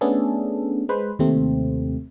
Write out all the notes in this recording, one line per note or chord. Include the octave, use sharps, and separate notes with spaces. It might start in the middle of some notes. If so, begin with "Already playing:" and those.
A3 B3 C#4 D4 G#4 A4
G#3 B4 C5
D#2 C3 A3 C4